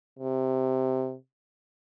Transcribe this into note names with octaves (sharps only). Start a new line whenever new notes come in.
C3